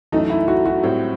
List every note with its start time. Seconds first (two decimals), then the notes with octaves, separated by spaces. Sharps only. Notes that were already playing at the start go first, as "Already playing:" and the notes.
0.12 F#2 E3 A3 D#4
0.30 E4
0.48 F#4
0.66 F#4
0.83 A2 G3 C4